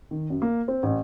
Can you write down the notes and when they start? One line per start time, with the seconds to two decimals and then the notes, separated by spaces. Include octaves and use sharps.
0.11 D#3
0.30 F#2
0.42 A#3
0.68 C4
0.83 A1